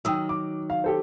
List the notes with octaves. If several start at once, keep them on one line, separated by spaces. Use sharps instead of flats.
D#3 F#3 G5 D#6 E6
D6
F5
G4 A4 C5